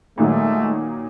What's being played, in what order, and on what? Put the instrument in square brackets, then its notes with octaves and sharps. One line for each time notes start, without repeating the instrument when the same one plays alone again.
[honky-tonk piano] A#2 D#3 F#3 [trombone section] G#3 A3